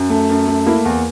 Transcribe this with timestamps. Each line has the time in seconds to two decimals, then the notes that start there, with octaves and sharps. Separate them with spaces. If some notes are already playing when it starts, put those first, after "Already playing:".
Already playing: F#2
0.10 A3
0.30 F#2
0.48 A3
0.67 A#3 E4
0.85 E2